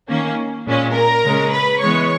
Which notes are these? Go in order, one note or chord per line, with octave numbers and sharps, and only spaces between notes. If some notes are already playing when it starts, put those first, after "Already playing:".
D#3 A#3 C#4
A#2 G#3 C#4
A#4 A#5
C#3 G#3 C#4
B4 B5
E3 G#3 B3 C#5 C#6